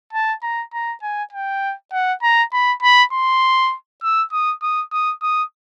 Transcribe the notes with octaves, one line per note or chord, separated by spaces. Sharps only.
A5
A#5
A#5
G#5
G5
F#5
A#5
B5
B5
C6
E6
D#6
D#6
D#6
D#6